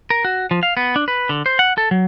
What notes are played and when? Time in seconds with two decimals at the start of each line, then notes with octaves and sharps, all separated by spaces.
0.10 A#4
0.25 F#4
0.51 F3
0.63 F5
0.77 B3
0.96 D4
1.08 B4
1.29 D3
1.46 C5
1.59 F#5
1.78 A4
1.91 F#3